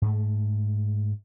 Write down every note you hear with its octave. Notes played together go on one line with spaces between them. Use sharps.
G#2 A3